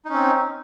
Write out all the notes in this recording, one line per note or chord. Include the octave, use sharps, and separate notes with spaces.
C4 C#4 D#4